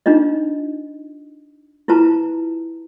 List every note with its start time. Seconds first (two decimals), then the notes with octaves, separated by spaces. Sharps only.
0.06 D4 D#4 F4 D#5
1.88 E4 F4 B4 A5 A#5